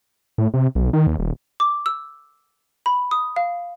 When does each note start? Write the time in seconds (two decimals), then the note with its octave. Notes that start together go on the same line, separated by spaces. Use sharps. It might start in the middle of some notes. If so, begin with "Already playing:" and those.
0.38 A2
0.54 C3
0.75 B1
0.93 D#3
1.07 D#2
1.19 D#1
1.60 D6
1.86 E6
2.86 B5
3.11 D#6
3.36 F5